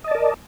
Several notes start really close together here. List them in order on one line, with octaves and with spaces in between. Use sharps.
D#5 A5 D5 A#4